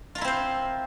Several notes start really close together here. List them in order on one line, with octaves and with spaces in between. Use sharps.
F4 A#4 E4 C4 C5